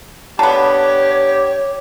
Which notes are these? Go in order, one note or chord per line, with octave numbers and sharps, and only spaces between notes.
D3 B3 G4 C#5 A5